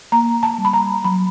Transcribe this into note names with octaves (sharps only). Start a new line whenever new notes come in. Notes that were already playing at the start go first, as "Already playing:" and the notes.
A#3 A#5
A5
G3
B5
A#5
F#3 B5